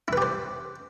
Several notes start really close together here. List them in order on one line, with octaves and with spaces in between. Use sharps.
E4 B4 G4 C5